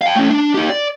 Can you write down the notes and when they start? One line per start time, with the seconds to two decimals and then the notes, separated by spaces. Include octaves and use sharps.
0.01 F5 G5
0.15 A3 C#4
0.30 D4
0.54 D#4 G4
0.70 D5